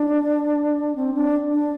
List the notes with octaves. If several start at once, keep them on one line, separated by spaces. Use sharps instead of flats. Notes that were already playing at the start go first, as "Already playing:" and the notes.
Already playing: D4
C4
D4
D4